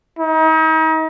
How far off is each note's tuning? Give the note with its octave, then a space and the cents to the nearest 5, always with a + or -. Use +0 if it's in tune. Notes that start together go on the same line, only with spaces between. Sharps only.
D#4 +40